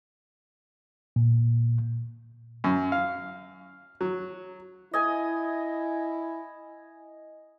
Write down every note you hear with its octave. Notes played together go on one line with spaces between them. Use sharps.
A#2
F#2
F5
F#3
E4 D#5 G#5